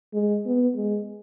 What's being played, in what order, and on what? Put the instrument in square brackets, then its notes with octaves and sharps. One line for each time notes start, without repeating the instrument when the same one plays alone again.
[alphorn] G#3
B3
G#3